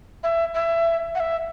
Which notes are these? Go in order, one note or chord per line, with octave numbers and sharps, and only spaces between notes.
E5
E5
F#5
E5